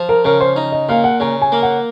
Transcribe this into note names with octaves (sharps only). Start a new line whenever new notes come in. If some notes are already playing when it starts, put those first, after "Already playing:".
Already playing: F3
A#4
C#3 A#4
C5
D#4
D#5
A#2 F5
F#5
C#3 A#5
G#5
A#3
F#5